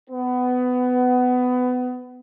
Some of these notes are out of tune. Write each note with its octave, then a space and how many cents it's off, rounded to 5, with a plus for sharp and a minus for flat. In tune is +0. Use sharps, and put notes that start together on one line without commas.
B3 +20